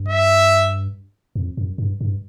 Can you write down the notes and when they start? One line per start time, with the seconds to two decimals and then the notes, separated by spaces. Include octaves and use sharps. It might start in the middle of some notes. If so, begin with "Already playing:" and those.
Already playing: G2
0.09 E5
1.36 F2
1.57 F#2
1.78 G2
2.01 G2